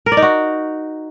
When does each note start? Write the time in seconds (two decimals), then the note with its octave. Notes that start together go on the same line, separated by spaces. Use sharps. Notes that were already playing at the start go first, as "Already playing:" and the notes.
0.06 A#4
0.12 D5
0.17 D#4
0.22 F#4